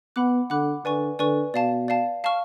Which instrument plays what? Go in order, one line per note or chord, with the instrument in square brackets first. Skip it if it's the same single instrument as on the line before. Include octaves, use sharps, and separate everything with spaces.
[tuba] B3 [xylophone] F#5 B5 D6 F#6
[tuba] D3 [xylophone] F#5 B5 D6 F#6
[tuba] D3 [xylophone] B4 D5 G#5 C#6
[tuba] D3 [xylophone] B4 D5 G#5 C#6
[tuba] B2 [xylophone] D5 F5 A5
[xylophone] D5 F5 A5
F5 A5 C#6 F6